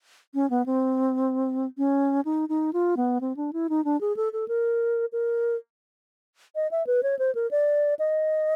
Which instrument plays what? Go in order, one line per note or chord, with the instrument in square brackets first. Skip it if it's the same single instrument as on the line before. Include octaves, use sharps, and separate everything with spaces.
[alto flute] C#4
B3
C4
C#4
D#4
D#4
F4
B3
C4
D4
E4
D#4
D4
G#4
A4
A4
A#4
A#4
D#5
E5
B4
C#5
C5
A#4
D5
D#5